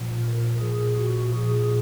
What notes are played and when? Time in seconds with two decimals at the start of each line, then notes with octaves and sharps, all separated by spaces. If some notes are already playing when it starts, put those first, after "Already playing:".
Already playing: A#2 F3
0.22 A#4
0.59 A#2 F3 G#4
0.97 F#4
1.35 A#2 F3 G#4